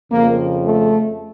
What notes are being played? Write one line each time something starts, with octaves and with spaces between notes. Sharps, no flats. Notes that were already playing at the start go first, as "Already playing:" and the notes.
F2 C#3 F3 A#3
A3